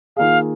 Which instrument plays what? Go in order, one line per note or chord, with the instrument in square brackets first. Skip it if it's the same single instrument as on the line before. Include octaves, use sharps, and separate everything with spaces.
[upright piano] D#3 A#3 F4 G#4 [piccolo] F5